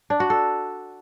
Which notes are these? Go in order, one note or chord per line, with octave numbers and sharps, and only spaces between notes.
D4
F#4
A4